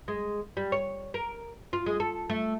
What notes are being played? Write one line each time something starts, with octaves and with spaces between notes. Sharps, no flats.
G#3
G3
C#5
A#4
F4
G#3
A4
A3